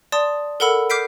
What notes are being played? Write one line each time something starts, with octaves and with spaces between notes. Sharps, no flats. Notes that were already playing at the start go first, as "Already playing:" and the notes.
D5 A5 C6 D#6
A4 A#4 F#5 B5 E6
D6 F6 G6 B6 C7 D7